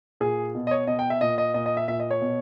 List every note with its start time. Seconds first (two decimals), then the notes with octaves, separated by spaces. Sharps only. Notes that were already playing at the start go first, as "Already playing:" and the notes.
0.20 A#2 G#4
0.55 B2
0.67 D#5
0.71 C#5
0.87 B2 D#5
0.99 G5
1.10 E5
1.21 A#2 D#5
1.38 D#5
1.54 A#2 D#5
1.66 D#5
1.77 E5
1.88 A#2 E5
2.00 D#5
2.11 C#5
2.21 B2